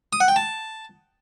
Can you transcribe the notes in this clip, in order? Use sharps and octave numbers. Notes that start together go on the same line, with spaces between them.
D#6
F#5
G5
A5